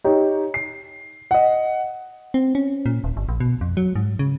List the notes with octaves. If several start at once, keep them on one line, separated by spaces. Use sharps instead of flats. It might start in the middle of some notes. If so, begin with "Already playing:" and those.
D#4 G4 C#5
C7
D#5 F#5
C4
C#4
A#2
D#1
G1
A#1
B2
F2
F#3
G#2
C#3